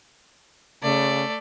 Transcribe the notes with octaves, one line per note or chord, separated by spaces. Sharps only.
C#3 A3 D5